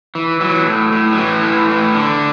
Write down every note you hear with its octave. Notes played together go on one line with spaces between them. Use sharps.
E3
E3 F#3
A2
A2
F#3
A2 E3
A2
A2
D3